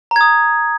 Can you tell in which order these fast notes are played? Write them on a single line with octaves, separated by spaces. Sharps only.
A#5 G#6 D#6